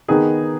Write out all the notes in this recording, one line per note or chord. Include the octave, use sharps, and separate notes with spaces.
D#3 B3 D#4 G#4